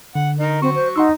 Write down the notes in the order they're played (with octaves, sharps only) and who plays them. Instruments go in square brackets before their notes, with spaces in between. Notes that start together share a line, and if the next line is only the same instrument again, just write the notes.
[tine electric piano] D3 [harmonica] F#5
[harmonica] D#4 A#4
[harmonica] F#3 C#6 [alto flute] C4
[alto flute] C5
[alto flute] D#4 [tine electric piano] F#5 C6 E6